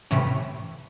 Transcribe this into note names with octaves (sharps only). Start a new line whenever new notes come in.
A2 C3 E3 C#4